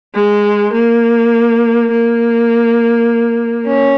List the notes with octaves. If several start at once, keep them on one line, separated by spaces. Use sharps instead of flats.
G#3
A#3
A#3
C#4